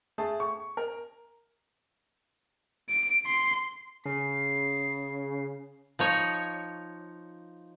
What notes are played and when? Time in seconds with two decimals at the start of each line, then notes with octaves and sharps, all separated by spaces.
0.18 A3 G#4 A5
0.40 C#6
0.77 A#4
2.89 D7
3.27 C6
4.05 C#3 C7
5.99 F3 D#4 C#5